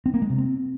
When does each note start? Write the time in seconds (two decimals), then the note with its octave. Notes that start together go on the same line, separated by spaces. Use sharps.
0.06 C4
0.14 A#3
0.22 G#3
0.30 C3
0.38 C4